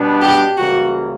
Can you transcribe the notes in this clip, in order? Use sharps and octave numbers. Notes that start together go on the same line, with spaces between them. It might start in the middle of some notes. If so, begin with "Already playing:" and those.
Already playing: B2 G3 B3 D4
G4
C#2 C#3 E3 G3 A#3 F#4